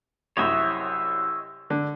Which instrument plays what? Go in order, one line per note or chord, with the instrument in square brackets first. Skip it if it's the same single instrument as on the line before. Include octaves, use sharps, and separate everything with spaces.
[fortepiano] C2 F#2 E4 [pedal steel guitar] C#5 D#5 E5
[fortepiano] D3